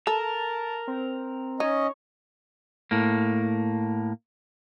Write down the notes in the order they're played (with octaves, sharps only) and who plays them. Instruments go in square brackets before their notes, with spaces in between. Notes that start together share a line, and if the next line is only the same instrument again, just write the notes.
[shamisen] A4 [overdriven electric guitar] A#4 [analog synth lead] A5
[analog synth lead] C4
[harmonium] C#4 D#5 [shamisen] D#4 [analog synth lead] C#5
[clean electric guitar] A2 A#3